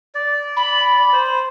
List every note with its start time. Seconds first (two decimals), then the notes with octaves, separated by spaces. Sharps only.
0.15 D5
0.57 B5
1.13 C5